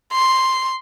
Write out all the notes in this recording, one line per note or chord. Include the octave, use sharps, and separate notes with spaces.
C6